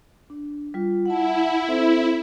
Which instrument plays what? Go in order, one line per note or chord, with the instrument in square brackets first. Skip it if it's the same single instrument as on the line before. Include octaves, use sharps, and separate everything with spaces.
[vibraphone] D4
G3 F4
[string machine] E4 [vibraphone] F#5 A5
[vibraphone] C4 A4 C5